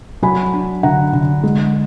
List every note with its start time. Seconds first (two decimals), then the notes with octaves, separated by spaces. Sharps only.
0.22 F#3 G#5 B5
0.53 D4
0.83 D3 F#5 A#5
1.13 D3
1.43 G#3